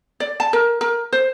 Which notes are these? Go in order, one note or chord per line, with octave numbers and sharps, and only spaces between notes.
D5
A5
A#4
A#4
C5